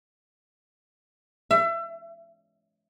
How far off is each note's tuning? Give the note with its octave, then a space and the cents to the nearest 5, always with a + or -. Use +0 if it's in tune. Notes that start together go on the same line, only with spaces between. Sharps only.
E5 +30